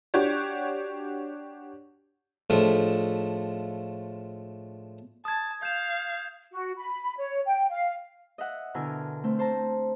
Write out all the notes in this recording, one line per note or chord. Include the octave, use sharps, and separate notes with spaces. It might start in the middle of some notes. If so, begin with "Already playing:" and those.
D4 F#4 G4 C#5
A2 F3 G#3 A3 D4 F4
A5 D#6 G#6
F5 G6 E7
F#4
B5
C#5
G5
F5
D#5 E5 F#5
B2 D3 E4 A#4 G#5 F6
A3 C4
C5 A5 A#5